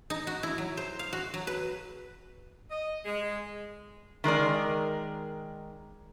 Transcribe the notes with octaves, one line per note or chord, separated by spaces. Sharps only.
D#4
F#4
E4
F#3
C5
F5
F#4
F#3
B4
D#5
G#3
D#3 G#3 A#4 D5